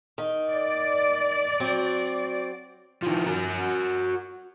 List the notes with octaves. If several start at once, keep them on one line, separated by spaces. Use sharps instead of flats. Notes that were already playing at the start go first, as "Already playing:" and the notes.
D#3
D5
F#3 C4 F#4
D#3 F3
F#4 A#4